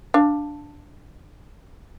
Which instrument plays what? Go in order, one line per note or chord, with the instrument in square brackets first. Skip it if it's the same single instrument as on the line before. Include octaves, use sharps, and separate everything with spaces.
[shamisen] D4 F5